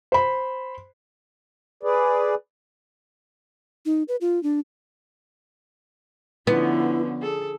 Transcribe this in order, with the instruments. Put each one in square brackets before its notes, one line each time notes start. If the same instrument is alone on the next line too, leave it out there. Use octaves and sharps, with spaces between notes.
[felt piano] C5 B5
[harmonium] G#4 B4 D5
[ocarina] D#4
B4
F4
D4
[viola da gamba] D3 F3 C#4 [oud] B3 [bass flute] E4
[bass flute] G#4 [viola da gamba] A4